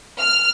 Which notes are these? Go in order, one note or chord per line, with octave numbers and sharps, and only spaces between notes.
F6